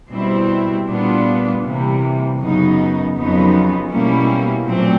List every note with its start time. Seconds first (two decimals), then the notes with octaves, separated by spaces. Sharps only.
0.12 B2 G3 C4 E4
0.88 A#2 G3 B3 D4 F4
1.63 C3 E3 G3 A#3
2.39 F#2 C#3 F#3 B3 D#4
3.15 F2 C#3 F#3 B3 D#4
3.91 B2 G3 A#3 C#4 E4
4.66 A#2 F#3 A3 C4